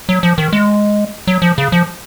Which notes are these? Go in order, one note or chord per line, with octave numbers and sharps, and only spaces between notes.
F#3
F3
D#3
G#3
F#3
F3
C#3
F3